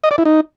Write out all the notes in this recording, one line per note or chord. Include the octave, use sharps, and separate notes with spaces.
D#5
D5
E4
D#4